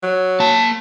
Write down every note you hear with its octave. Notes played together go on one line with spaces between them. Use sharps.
F#3
A#3 A5